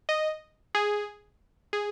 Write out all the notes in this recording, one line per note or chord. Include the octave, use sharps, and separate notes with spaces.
D#5
G#4
G#4